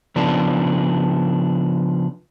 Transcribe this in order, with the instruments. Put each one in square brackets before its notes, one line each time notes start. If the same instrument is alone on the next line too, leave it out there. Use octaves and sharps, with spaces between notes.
[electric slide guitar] C#3 F3 B3 D4